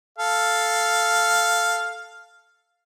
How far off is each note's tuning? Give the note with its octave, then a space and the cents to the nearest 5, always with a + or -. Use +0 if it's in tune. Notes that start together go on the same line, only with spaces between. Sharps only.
A4 +0 F5 +0